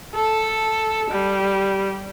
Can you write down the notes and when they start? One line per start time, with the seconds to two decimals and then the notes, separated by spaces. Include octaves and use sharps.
0.15 A4
1.11 G3